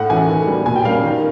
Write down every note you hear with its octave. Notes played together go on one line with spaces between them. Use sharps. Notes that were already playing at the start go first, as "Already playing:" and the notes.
Already playing: A2 F#5
E3 A3 C#4 G#5
D#3
G3 B3
A#2 G#5
G5
G3 A#3 C#4 F5
D#3